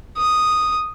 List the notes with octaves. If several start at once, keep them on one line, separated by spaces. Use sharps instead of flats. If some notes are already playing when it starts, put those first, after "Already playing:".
D#6